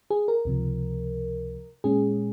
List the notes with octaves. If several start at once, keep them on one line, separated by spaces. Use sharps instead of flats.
G#4
A#4
C#2 C3 F3
A#2 G#3 C#4 G#4